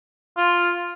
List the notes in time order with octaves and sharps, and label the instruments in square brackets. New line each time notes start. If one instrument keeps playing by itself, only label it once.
[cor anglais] F4